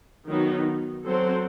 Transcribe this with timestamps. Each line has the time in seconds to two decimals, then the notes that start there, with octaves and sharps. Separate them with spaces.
0.29 D#3 F#3 B3 D#4
1.06 F#3 C4 F#4 A4 C5